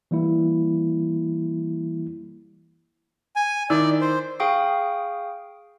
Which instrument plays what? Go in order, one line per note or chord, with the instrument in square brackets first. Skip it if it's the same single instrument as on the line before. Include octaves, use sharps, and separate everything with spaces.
[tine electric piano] E3 G3 A#3 E4
[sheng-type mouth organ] G#5
[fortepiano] D#3 E4 E6 [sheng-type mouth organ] D5
[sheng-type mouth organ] C5
[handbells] G#4 F5 G5 C#6 D#6